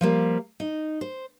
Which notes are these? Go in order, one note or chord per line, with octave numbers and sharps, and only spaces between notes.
F3 G3 A#3
D#4
C5